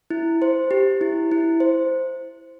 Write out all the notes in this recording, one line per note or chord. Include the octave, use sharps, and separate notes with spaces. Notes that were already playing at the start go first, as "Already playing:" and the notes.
E4
C5
G4
E4
E4
C5